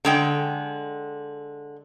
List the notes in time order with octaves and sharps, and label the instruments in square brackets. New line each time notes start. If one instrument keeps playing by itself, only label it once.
[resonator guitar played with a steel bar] D3 G#3 G5